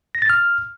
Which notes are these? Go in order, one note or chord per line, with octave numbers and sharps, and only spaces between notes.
A#6
A6
F6